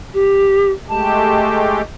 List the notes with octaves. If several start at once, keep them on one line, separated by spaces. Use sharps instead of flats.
G4
G#3 A3 G4 A5